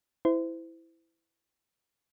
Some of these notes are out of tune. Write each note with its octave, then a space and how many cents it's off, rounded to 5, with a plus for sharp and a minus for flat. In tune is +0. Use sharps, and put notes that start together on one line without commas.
E4 +0 C5 -35